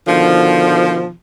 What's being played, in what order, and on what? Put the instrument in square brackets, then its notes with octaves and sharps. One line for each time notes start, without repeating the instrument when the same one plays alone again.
[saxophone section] B2 D3 D#3 F3